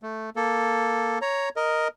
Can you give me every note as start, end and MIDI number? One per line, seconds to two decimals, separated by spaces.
0.03 0.30 57
0.36 1.19 58
0.36 1.19 69
1.22 1.49 73
1.22 1.49 82
1.56 1.88 70
1.56 1.88 75